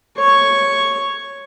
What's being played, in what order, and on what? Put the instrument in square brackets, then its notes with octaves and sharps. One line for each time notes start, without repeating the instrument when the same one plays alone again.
[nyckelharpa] C#5 C#6